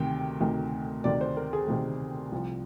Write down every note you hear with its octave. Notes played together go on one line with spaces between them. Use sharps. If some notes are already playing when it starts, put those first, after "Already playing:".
Already playing: D2 C3 D#3 G5
D2 C3 D#3
D2 C3 D#3 D5
C5
A#4
G#4
D2 C3 D#3 G#4
C2 C3 F3